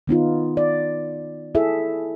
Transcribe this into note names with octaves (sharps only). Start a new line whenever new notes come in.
D#3 B3 D#4 F4
D5
E4 G#4 A4 E5